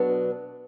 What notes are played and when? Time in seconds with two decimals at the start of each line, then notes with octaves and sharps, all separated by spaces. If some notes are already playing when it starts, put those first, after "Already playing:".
Already playing: B2 F#3 B3 D4